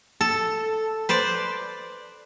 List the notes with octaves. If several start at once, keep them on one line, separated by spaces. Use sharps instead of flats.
A4
B4 C5 D5